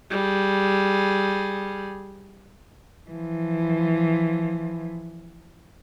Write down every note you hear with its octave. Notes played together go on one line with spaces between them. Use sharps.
G3 G#4
E3 F3